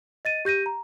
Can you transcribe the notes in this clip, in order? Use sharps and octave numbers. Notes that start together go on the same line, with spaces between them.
D#5 A6 D#7
G4 G6 A#6 D#7
A#5